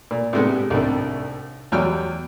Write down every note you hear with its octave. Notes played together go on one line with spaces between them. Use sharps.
A#2
A2 C3 G3 G#3 B3
C2 A2 D#3 D4
E2 F#3 G3 C#5 G5 F6